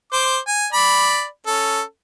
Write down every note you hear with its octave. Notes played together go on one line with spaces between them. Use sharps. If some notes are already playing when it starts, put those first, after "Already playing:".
C5 D6
G#5
D5 B5
C#4 A4